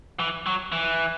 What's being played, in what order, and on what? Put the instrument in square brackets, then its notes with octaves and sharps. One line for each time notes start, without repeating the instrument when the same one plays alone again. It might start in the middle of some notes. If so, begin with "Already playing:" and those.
[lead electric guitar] E3
F#3
E3